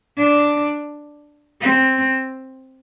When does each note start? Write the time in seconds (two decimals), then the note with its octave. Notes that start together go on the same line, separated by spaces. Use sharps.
0.18 D4
1.61 C4